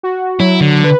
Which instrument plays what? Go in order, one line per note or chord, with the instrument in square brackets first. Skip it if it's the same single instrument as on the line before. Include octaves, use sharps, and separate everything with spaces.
[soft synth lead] F#4
[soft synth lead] F#3 [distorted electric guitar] E4
[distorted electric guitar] D3
[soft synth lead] B4